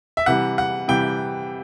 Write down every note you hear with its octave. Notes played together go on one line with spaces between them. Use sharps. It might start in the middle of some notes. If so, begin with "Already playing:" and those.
E5
C3 E3 G3 F#5
F#5
C3 E3 G3 G5